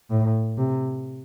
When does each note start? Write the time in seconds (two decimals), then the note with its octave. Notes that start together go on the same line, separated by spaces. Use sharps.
0.11 A2
0.58 C3